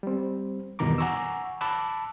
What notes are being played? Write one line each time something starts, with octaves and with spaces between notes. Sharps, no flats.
G3 C4
E2 G2 B2 D#3 A#5 D6
F#5 G#5 A#5 C#6 D6 E6
A5 B5 D6 E6 F#6